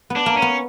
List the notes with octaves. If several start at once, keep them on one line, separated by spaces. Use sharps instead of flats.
B3
D4
A#3
C#4
B3